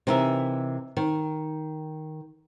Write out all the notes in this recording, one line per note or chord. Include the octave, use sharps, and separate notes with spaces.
C3 E3 D#4 A#4 E5
D#3